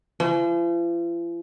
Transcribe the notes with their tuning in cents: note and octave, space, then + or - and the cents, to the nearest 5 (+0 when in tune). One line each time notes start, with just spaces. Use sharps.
F3 -45